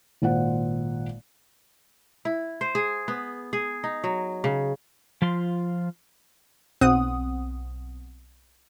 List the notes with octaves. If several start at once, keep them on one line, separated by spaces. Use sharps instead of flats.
G#1 A#2 F4 C5 F#5
E4
C5
G#4
B3
G#4
D#4
F#3
C#3
F3 F4 C6
B1 C4 F#5 D#6